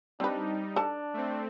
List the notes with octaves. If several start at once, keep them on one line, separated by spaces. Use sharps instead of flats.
G3 C4 D4 D#4 B4
D4 A4 A5
A3 C4